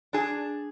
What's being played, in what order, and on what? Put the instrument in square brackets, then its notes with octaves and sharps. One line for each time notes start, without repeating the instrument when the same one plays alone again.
[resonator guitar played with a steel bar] D4 G#4